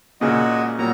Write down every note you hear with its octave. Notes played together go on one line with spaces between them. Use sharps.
A#2 C#3 G#3 F#4 D#5
A#2 F#3 G3 A#5